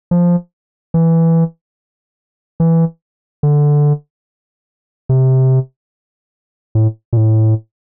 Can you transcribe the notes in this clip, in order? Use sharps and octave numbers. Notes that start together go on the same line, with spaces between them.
F3
E3
E3
D3
C3
A2
A#2
A2